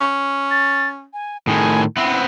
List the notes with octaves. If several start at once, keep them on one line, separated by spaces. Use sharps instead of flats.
C#4
A6
G#5
A2 D#3 G#4 G#5
B3 C4 E4 E5